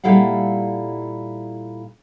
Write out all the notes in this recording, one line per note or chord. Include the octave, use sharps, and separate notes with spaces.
A#2 G3 E4 A4 F5 F#5